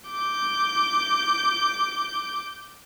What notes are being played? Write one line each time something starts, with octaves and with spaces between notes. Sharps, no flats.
D6 G6